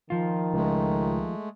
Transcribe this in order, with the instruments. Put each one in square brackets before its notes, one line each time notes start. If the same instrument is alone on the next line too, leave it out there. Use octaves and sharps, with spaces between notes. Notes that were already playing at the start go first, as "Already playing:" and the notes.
[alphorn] D#3 [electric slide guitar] F3 F4
[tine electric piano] C#2 [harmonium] G#3 A3